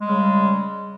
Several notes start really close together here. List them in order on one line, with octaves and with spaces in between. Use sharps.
G#3 G3 C#3